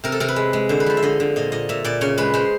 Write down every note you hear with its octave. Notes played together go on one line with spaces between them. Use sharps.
C3 A#4
A4
C3 A#4
B4
G#3
G#3
D3 C5
B4
F3 C5
E5
D3 D#5
D3
A#2 D#5
A#2 D#5
A#2 E5
A#2 D5
C#3 C#5
G#3 B4
G#3 C5